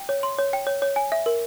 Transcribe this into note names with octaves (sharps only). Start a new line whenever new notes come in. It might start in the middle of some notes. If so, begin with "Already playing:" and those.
Already playing: G5
C#5
C6
C#5
G5
C#5
C#5
G#5
E5
A#4